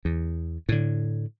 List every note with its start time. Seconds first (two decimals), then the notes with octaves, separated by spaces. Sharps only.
0.05 E2
0.69 A2 D3